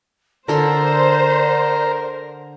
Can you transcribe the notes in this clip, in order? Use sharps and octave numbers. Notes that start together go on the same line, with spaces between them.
D3 A4 A#4 C5 D5 C6